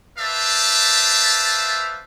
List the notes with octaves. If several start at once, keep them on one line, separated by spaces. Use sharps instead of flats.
B4 C5 D5 E5 F5 A5